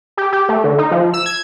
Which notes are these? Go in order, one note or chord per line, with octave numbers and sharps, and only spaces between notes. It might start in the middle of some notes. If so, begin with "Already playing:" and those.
G4
G4
A3
D3
D#4
F3
E6
G#6